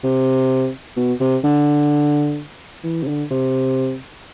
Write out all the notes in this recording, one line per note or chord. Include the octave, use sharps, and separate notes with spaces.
C3
B2
C3
D3
E3
C3
D3
C3